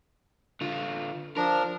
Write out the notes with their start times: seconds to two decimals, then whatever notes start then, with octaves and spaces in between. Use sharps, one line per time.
0.61 D3 F4
1.37 F3 D4 A#4